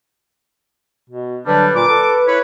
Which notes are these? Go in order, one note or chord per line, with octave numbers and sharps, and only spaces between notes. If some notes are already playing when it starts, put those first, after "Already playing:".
B2
D3 F#3 G3 D4 B4
A#2 D6
A4
E4 B4 C#5